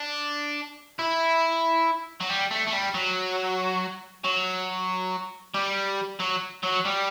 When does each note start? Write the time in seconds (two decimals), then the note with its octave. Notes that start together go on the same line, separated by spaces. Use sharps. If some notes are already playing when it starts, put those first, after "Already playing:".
Already playing: D4
0.99 E4
2.21 F#3
2.29 G3
2.51 A3
2.67 A3
2.73 G3
2.94 F#3
4.24 F#3
5.54 G3
6.20 F#3
6.63 F#3
6.85 G3